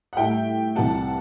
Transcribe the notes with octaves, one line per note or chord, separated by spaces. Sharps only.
F#5
A2 G3 E5 G5
C2 C3 E3 G3 F#5 A5